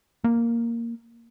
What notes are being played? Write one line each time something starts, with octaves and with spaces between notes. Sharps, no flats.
A#3